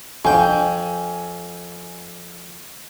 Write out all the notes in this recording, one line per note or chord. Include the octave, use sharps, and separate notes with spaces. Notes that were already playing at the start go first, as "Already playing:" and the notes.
F2 G5 G#5